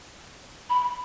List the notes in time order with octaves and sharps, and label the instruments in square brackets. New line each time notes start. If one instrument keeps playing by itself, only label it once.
[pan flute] B5